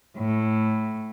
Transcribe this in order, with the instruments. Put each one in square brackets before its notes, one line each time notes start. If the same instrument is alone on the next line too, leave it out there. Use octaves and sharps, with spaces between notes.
[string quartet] A2